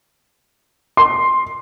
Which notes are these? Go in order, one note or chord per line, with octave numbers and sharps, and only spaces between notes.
C6